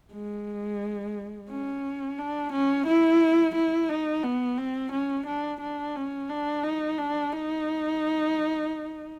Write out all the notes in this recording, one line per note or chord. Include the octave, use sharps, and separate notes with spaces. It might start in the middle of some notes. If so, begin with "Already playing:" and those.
G#3
C#4
D4
C#4
E4
E4
D#4
B3
C4
C#4
D4
D4
C#4
D4
D#4
D4
D#4